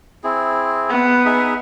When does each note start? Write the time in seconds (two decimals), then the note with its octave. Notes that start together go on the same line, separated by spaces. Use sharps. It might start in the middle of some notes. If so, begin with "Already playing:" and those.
0.24 C4 E4 G#4
0.90 B3
1.25 D#4 G#4 E5